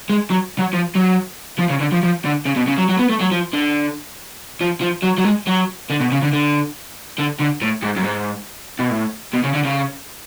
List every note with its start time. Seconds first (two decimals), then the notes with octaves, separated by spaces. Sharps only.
0.09 G#3
0.30 F#3
0.58 F#3
0.73 F3
0.95 F#3
1.59 F3
1.70 C#3
1.80 D3
1.92 F3
2.03 F3
2.24 D3
2.45 C#3
2.56 B2
2.67 C#3
2.78 F#3
2.89 F#3
2.99 B3
3.09 A3
3.20 F#3
3.31 F3
3.53 D3
4.61 F3
4.81 F3
5.03 F#3
5.18 F#3
5.25 G#3
5.47 F#3
5.90 D3
6.00 B2
6.11 C#3
6.22 D3
6.33 D3
7.19 D3
7.40 D3
7.62 A2
7.82 G#2
7.96 F#2
8.04 G#2
8.79 B2
8.90 A2
9.34 B2
9.44 C#3
9.54 D3
9.65 C#3